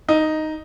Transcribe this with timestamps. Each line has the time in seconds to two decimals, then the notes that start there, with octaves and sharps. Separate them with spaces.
0.09 D#4